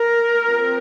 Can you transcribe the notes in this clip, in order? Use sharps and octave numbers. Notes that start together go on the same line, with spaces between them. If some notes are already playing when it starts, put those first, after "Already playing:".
Already playing: A#4
F3 C4